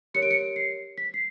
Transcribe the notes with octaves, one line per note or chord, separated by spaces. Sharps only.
G4 A#4 C#5 C#7
D7
C#7
C7
B6
C7